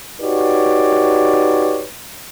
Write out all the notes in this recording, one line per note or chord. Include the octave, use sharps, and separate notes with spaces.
D#4 F#4 G4 B4 C#5 D5